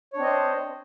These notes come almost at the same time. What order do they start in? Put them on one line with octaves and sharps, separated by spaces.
C#5 D4 C4 D#5 C5